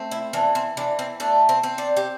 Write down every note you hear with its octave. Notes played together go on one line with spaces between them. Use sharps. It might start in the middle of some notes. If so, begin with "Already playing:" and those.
Already playing: A3 C4
E4
E3 D4
C4
E3 D4
C4
A3 D4
C4
C4
D4
G4